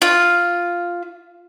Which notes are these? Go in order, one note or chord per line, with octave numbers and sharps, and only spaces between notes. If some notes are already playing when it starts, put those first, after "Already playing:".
F4